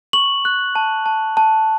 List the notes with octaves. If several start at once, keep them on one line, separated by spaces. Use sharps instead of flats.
C#6 F#7
F#6
A5
A5
A5